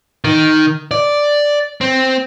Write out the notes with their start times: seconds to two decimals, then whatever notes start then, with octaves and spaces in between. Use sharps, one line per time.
0.25 D#3
0.91 D5
1.81 C4